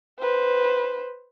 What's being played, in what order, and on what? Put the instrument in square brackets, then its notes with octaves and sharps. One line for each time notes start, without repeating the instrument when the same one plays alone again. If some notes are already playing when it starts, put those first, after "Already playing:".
[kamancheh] B4 C5